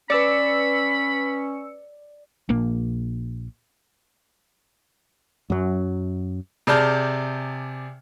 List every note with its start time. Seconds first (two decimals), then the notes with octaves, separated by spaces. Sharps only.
0.10 C#4 B4 D5 B5 E6 C#7
2.49 A#1 A#3
5.50 F#2 F#3
6.67 C3 G#4 D5 A5 F6 G6